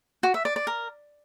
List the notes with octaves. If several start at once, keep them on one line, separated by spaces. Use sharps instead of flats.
F#4
E5
D5
D5
A#4